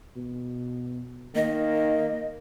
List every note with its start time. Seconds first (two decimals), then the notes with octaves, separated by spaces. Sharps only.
0.16 B2
1.36 D#3 A#3 D#5